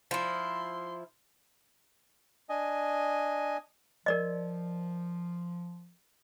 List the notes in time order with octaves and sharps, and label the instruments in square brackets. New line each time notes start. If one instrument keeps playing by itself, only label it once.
[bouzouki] F3 E4 [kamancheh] C6
[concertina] D4 D#5 G#5
[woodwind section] F3 [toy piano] A#4 D5 D#5